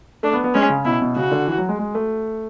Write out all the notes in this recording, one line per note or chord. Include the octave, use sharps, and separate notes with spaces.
A3 D4
B3
B3
G#3 C#4
C#3
B2 E4
B2
C#3 F#4
D3
E3
F#3
G#3
G#3
A3